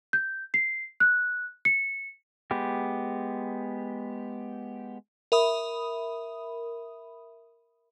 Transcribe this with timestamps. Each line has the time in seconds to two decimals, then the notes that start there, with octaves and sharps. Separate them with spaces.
0.13 G6
0.54 C7
1.00 F#6
1.65 C#7
2.51 G#3 B3 G4
5.32 A#4 E5 B5 D#6